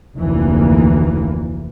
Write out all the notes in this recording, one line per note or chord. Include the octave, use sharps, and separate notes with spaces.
F1 D2 E3 A#3